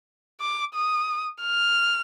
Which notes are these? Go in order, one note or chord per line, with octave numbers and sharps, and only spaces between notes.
D6
D#6
F6